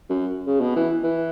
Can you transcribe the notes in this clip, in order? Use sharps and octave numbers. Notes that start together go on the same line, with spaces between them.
F#2
C#3
B2
E3
E3